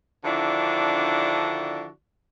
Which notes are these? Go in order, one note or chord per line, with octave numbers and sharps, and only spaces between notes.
D3 D#3 F3 D4 E4 F#4